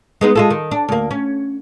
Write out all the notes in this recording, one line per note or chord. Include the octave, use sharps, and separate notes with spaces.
G#3 B3 D#4
G#3 F4 A4
D#3
D4
D2 A#3
C#4